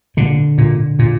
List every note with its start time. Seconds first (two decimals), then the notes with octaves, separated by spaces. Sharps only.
0.17 A#2 D3
0.58 A#2
0.99 A#2